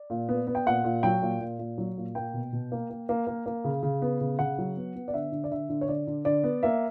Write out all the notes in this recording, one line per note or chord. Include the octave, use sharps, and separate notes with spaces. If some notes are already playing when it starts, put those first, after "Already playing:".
Already playing: D5
A#2
B3
B3
G5
A#2 F#5
A#2
F#3 G5
A#2
A#2
A#2
F#3
A#2
A#3 G5
B2
B2
A#3
A#3
A#3
A#3
A#3
C#3
C#3
B3
C#3
C#3 F#5
F#3
B3
B3
D5
D3 E5
D3
D5
D3 E5
D3
C#5
D3 D5
D3
D3 D5
B3
A#3 E5